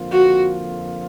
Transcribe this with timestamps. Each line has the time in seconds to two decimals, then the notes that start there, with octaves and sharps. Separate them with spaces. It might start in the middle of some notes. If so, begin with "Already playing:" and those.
Already playing: F2 D3 F3 A#3 F4
0.11 F#4